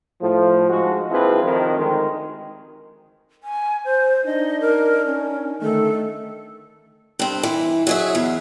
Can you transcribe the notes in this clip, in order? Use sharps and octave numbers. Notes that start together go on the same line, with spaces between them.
A2 F3
G#2 F3 G#3 F#4
A#1 F3 C4 E4 G#4 B4
F2 C3 D#3
D2 D#3 G#3
G#5
C5
D4 D#4 D#5
A#4
C#4
D3 D#3 A3 A4
G2 C4
E3
F#3 G#4 E5
E2